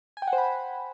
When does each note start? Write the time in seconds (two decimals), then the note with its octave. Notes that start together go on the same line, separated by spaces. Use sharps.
0.17 G#5
0.22 G5
0.27 F#5
0.33 C5
0.38 B5